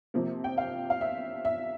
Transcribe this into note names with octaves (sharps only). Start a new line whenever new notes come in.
C3 F3 A#3
G5
F5
F5
E5
E5